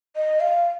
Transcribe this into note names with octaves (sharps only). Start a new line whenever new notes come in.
D#5
F5